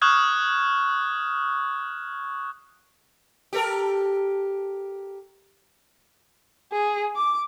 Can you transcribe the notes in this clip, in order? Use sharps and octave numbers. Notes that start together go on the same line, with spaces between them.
C#6 D#6 F6 F#6 G#6
G4 A4 A#4
G#4
D6